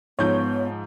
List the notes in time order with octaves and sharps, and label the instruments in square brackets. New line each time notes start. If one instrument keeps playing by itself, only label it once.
[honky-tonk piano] G#2 F3 G6 [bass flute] B3 [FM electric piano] C#5